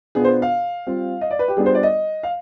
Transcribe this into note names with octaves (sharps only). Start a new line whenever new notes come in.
B2 B3 D4 F4 G#4
C5
F5
G3 C4 F4
D#5
D5
B4
G4
G3 B3 D4 F4 G#4
C5
D5
D#5
F5